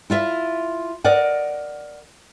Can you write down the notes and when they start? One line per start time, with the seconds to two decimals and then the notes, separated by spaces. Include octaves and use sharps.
0.10 E4 F4 E5
1.04 A#4 D5 D#5 F#5